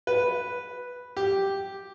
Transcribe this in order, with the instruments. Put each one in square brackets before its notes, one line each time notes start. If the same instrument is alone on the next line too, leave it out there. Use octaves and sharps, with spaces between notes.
[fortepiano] B4
G4